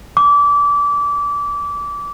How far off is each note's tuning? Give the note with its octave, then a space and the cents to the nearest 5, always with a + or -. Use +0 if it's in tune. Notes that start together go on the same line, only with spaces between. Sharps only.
D6 -25